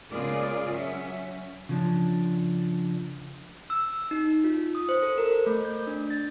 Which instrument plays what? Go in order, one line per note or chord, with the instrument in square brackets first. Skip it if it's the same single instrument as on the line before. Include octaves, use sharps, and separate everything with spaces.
[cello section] C#3 G#3 F4 G#4 A#4 D5
F#3 C#4 E5
[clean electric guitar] C#3 F3 D4
[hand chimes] E6
D#4
F4
D#6
C5
A4
A#4
A3
G6
D4
A6